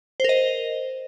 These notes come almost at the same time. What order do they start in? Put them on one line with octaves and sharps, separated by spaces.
C5 A#4 D#5